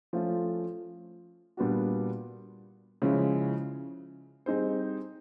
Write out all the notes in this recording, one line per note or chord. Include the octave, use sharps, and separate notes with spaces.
F3 A3 C#4 F4
A#2 G3 B3 D4 F#4
C#3 F3 G#3 C#4 E4
G3 C4 D#4 G#4 C5